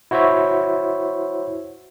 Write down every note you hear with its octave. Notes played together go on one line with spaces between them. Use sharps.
E4 F#4 C5 C#5 E5